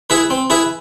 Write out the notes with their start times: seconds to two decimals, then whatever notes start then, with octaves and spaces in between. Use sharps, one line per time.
0.10 E4 G#4 B4 E5
0.30 C4
0.50 E4 G#4 B4 E5